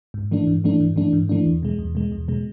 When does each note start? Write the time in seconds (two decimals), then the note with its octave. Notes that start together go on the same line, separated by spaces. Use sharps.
0.14 G#2
0.31 E3 A3 D4
0.47 G#2
0.64 E3 A3 D4
0.80 G#2
0.96 E3 A3 D4
1.13 G#2
1.29 E3 A3 D4
1.46 E2
1.63 B2 G#3
1.78 E2
1.95 B2 G#3
2.12 E2
2.28 B2 G#3